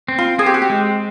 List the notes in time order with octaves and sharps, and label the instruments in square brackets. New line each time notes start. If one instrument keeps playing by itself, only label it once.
[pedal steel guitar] C4
[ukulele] F4
[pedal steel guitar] C4 [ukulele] G#4
[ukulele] G4
F#4
G4
[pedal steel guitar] G#3